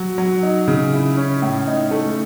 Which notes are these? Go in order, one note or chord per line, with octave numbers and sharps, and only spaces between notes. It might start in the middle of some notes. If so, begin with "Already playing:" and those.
Already playing: F#3
F#3
D#4
C#3
E4
C#4
A2
D#4
A3